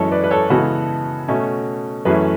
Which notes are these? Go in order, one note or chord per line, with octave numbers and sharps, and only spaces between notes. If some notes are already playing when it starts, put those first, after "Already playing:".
Already playing: F#2 E3 G#3 C#4 A4 C#5
B4 D5
B4
A4 C#5
C#3 E3 G#3 B3 F#4 A4
B2 A3 C#4
F#2 E3 A3 C#4 G#4 B4